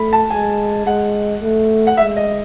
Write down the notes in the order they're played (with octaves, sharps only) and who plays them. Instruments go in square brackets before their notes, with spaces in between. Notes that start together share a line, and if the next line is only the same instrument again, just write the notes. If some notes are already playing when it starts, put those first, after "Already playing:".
Already playing: [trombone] A3 [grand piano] B5
[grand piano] A5
[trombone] G#3 [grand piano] G#5
[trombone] G#3 [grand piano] F#5
[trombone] A3
[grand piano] F#5
[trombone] G#3 [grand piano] E5
[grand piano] D#5